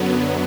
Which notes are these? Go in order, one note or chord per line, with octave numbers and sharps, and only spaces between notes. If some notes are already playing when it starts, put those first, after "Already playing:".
Already playing: F#2 D3 F#3 B3